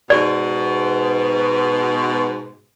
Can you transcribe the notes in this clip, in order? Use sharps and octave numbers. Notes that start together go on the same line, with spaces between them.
G#2 B2 D5